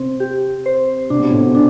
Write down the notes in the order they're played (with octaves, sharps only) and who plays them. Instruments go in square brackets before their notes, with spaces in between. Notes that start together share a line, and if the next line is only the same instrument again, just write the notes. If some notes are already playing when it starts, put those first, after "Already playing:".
Already playing: [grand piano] C3 [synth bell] C4 C5
[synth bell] G4
C5
[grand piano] C3 [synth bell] D4
[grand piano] B2
A2
B2
[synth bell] D4